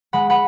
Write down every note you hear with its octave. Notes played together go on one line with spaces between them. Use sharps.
G#3 F#5 B5
F#5 B5